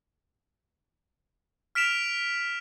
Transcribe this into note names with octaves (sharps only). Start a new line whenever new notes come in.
F6 B6 D7 E7 F7